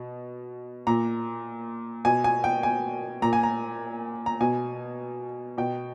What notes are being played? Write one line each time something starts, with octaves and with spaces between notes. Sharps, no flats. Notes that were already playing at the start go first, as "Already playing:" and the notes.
Already playing: B2
A#2 A#5
B2 G#5
G#5
G5
G#5
A#2 A#5
G#5
A#5
A#5
B2 G#5
B2 G5